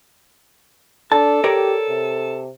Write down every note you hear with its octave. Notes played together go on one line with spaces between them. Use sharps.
D4 A4 A5
G4 A#4 C#5 D5
C3